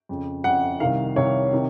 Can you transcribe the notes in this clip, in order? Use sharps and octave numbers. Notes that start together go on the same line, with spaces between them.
F2 C#3
F2 C#3 F#5
C2 C3 D#3 F5
C2 C3 D#3 C#5
C3 D#3